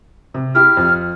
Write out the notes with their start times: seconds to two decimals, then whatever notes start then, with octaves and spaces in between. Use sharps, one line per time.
0.34 C3
0.55 E4 G4 F6
0.77 F2